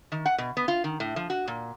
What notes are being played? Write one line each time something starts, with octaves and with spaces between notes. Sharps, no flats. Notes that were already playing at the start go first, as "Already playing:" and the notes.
D#3
F#5
B2
B3
F4
D#3
A2
F3
F#4
A#2